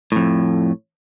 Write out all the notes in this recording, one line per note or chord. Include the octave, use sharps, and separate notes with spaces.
F2 A2